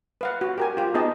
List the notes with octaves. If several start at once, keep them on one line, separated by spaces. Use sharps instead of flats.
B4 F5 F#5
F#4
G4 A#4 G#5
F4 G4
B3 D#4 G#4 D#5 A5